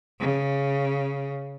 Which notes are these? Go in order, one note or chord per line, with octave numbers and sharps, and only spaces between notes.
C#3